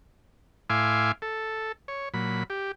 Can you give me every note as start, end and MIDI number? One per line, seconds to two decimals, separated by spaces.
0.70 1.12 45
0.70 1.12 64
0.70 1.12 77
0.70 1.12 80
0.70 1.12 84
0.70 1.12 86
1.22 1.72 69
1.88 2.09 73
2.14 2.43 46
2.14 2.43 54
2.14 2.43 83
2.50 2.72 67